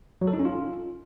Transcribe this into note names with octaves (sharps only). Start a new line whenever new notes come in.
F#3
A4
D#4
C#4
F4